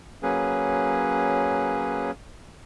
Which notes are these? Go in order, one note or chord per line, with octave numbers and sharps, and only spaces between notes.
F#3 A#3 C#4 G#4 B4